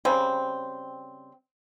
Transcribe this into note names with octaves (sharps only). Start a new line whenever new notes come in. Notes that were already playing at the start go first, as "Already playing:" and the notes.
C#3 G3 C4